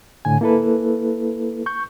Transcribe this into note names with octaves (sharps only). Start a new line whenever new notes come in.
A2 D3 G#5
A#3 E4 A4 B4
C#6 G6